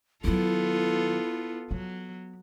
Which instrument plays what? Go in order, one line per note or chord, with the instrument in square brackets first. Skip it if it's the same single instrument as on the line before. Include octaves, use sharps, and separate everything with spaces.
[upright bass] D#3 F#3 [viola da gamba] B3 F4 A4 [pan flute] E4
[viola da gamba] F#3 [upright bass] B3